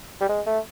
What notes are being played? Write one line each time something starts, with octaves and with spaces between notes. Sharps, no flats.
G3
G#3
A3